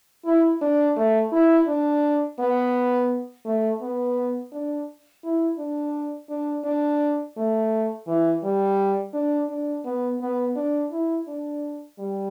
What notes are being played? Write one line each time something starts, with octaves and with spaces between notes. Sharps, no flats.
E4
D4
A3
E4
D4
B3
A3
B3
D4
E4
D4
D4
D4
A3
E3
G3
D4
D4
B3
B3
D4
E4
D4
G3